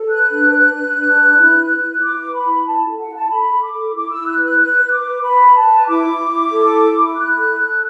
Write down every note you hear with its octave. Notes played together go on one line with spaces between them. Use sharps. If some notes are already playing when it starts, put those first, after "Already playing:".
Already playing: A4
B4 F#6
D4
B4
B4
D4
B4
E4
B4
E4
E4 D6
B4
B5
E4
E4 A5
A4
F#5
E4
A5
A4 B5
A4
D6
A4
E4 D6
E4 E6
F#6
B4
F#6
B4 F#6
B4
D6
B4
B4 B5
B4
A5
B4
E4 D6
E4
E4
A4
E4
E4
E4 F#6
A4
A4